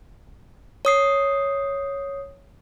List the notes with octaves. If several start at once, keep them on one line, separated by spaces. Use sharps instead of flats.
C#5 D#6 C7